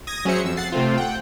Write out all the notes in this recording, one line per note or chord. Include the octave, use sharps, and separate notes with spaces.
D#6 G#6 A#6
F#3 C#4 G#4 C5 E5 C#7
F2 E6
F#5 A6 C7
C3 A3 C4 F4
F#5 G5